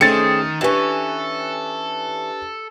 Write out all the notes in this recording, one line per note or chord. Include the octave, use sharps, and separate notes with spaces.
D#3 A3 C4 C#4 G#4 A6 C#7
E3 C#4 D4 G4 A4 B4